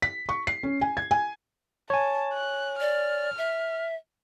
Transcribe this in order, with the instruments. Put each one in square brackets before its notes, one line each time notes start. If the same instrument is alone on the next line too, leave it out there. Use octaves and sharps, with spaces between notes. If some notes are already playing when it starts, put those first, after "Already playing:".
[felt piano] B6
C#6
C7
C#4
G#5
G#6
G#5
[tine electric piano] C#5 G#5 [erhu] A5
[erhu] F#6
[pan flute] D5 [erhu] F6
[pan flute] E5